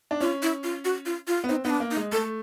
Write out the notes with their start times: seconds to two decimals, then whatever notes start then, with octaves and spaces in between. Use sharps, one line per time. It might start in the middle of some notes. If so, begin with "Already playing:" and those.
0.11 D4
0.20 C#4 F4
0.43 E4
0.64 F4
0.85 F#4
1.06 F4
1.28 F4
1.44 B3
1.49 C4 D#4
1.64 B3 D#4
1.70 D4
1.80 A#3
1.91 D#4
1.97 G#3
2.12 A3 A4